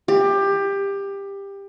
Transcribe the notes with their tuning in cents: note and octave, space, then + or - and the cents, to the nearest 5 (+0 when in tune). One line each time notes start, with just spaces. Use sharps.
G4 +20